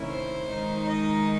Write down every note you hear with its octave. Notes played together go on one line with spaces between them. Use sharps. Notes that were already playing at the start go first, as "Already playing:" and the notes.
Already playing: C3 D#3 A3 C#4 E4
C5
D#3 G#3 D#4
D#5